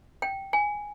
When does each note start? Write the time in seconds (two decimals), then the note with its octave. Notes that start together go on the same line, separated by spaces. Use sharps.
0.22 G5
0.53 G#5